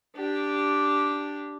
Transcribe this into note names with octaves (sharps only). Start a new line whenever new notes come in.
D4 G4